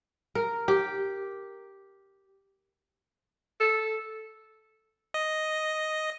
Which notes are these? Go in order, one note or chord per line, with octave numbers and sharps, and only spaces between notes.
A#4
G4
A4
D#5